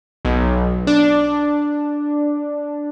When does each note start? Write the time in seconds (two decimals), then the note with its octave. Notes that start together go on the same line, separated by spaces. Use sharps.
0.25 B1
0.87 D4